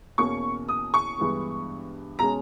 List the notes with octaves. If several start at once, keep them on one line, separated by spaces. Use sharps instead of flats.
E2 B2 A#3 C#4 C#6
D#6
C#6
G2 E3 G#3 B3
B2 G#3 C#4 A#5